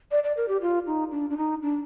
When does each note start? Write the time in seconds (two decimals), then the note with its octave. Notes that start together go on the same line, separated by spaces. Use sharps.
0.11 D5
0.24 D5
0.37 A#4
0.48 G4
0.62 F4
0.87 D#4
1.11 D4
1.30 D4
1.37 D#4
1.62 D4